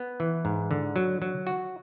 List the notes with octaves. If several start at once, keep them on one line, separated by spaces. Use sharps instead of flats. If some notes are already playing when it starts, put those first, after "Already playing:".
Already playing: B3
E3
G#2
D3
F#3
F#3
F#4